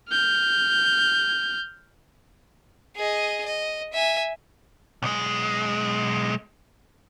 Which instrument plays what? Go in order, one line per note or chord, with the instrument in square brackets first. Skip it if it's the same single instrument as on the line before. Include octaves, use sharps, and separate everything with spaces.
[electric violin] F6 G6
[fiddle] G#4 D#5
D#5
E5 G#5
[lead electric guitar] B1 G#3